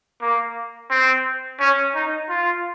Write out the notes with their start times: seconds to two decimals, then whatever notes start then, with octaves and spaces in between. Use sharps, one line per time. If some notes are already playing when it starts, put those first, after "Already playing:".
0.22 A#3
0.90 C4
1.60 C#4
1.95 D#4
2.29 F4